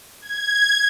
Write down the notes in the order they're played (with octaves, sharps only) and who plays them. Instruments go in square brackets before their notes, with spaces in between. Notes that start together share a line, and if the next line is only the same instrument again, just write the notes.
[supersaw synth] G#6